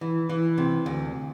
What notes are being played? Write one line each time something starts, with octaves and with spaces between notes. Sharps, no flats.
E3
E3
C3
D2